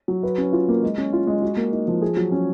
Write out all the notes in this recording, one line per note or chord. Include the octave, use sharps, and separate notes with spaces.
F#3
B4
C#4
F4
A#3
G#3
C#4
F4
G#3
F#4
A#3
D#4
F3
G#4
F#3
C#4